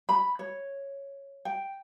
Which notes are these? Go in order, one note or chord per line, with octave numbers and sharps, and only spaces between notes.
B5
C#5
G5